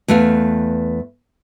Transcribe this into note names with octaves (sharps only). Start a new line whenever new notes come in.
E2 A3 B4 F5